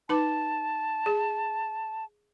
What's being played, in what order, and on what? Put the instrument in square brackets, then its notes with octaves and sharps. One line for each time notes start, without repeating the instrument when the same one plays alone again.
[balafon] D#4 B4 D6 [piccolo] A5
[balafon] G#4